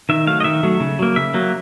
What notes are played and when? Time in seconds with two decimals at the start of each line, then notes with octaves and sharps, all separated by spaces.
0.09 D#3 E5
0.27 F#3 A3 F5
0.40 D#5
0.44 D#3 E5
0.63 F#3 A3
0.80 C#3
0.99 F#3 A#3
1.16 C#3 E5
1.34 F#3 A#3